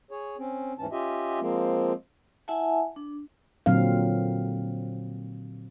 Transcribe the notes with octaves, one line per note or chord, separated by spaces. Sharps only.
G#4 C#5
C4 C#4
D#2 G#2 E3 C#4 A5
C#4 F4 G4 D#5 E5
F3 G#3 A#3 C4
E4 E5 F#5 G#5 A5
D4
A#2 D3 F#3 C4 F5